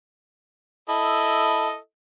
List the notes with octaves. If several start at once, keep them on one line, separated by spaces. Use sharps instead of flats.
E4 A4 D#5